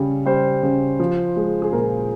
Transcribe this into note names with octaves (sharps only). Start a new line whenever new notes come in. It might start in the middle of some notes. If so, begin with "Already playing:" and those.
Already playing: C#3 G3
G3 C5
C#3
F3
G#3
G#4
A#2 A#4